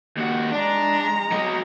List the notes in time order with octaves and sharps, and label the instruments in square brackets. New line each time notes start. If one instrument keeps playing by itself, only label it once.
[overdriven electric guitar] D#2 F#4
[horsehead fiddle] G#3 A#5 [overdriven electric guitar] D4
[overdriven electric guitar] F#3 D#5